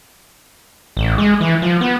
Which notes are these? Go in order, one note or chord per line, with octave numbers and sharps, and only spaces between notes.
A1
G#3
E3
F3
B3